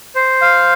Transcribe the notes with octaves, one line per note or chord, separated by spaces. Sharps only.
C5
F5